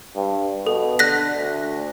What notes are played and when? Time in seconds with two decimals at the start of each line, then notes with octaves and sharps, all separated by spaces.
0.16 G2
0.67 B2 A4
0.99 D3 F#6 A#6 B6
1.36 D2